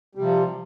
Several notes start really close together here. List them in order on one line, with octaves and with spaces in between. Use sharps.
G3 C3 F3